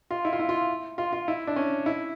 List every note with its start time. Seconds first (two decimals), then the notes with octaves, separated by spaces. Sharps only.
0.10 F4
0.25 E4
0.33 F4
0.39 E4
0.49 F4
0.98 F4
1.13 F4
1.28 E4
1.47 D4
1.56 C#4
1.86 E4